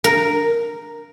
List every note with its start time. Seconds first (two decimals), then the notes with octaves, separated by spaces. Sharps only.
0.04 A#4